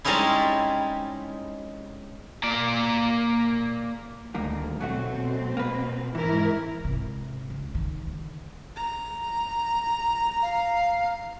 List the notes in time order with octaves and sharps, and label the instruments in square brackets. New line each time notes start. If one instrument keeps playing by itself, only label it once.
[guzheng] G3 G#3 C4 C#4 D#4 E4
[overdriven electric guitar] A#3 D5
[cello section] D2 [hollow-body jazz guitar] G2 D#3 A#3
[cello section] B2 C4 [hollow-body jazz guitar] F#3 A3 F#4
[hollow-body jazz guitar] A#3 B4
[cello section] G#2 E4 A#4 [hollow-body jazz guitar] E3
[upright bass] G#2 C3
C#2
D#3
D3
[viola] A#5
[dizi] F5